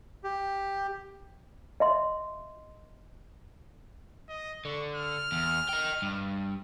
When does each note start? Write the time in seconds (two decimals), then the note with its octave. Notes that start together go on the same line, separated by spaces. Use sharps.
0.24 G4
1.80 D#5 E5 C6
4.28 D#5
4.65 D3 C#6
4.95 F6
5.32 E2
5.69 D#5 G5
6.02 G2